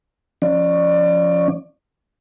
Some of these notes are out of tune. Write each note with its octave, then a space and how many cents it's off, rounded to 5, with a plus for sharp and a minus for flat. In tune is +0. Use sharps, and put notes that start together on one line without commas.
F3 +0 C#4 +0 D5 +30